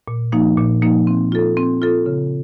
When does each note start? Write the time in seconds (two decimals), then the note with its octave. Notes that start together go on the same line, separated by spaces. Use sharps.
0.08 A#2
0.32 F3 A#3 D#4
0.57 A#2
0.82 F3 A#3 D#4
1.07 C4
1.32 F4 A4
1.57 C4
1.82 F4 A4
2.06 C#3